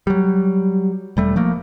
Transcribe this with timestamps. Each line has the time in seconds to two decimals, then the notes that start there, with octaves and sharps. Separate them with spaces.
0.07 F#3 G3
1.17 E1 G3 A3
1.36 F3 A3 A#3